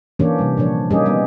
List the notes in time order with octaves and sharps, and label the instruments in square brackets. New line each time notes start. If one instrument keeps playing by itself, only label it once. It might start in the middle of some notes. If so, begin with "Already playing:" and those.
[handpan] E3 A#3 C#4 D4 G4 C#5
C3 G3
A#2 F3 D4 C#5
G3 A#3 C#4 D#4 G4 G#4
G3 B3 D#4